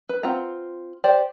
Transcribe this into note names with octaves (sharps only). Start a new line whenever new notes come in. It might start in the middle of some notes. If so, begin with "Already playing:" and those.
B4
C4 F4 F#5 A#5
G4 C5 D5